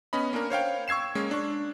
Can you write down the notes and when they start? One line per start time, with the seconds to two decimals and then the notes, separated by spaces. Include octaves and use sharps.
0.13 B3 C#4 D#5 B5
0.33 A#3 C#4 D4 A#4
0.50 C5 C#5 F5 G5
0.88 C#6 E6 G#6 C7 E7
1.15 G#3 A#3 C#4
1.31 D4 C#6